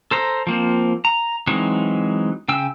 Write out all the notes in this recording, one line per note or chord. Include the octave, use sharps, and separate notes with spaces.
A4 C5 A#5
F3 A#3 C4
A#5
E3 F#3 G#3 C4 D#4
C#3 G5 E6